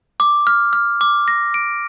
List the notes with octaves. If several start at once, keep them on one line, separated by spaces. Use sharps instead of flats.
D6
F6
F6
D6
A#6
D7